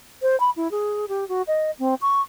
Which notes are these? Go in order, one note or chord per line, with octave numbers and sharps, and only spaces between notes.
C5
B5
E4
G#4
G4
F#4
D#5
C4
C#6